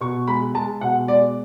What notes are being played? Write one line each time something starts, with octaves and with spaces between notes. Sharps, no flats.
B2 C#6
G#3 B5
G#3 A5
B2 F#5
G#3 D5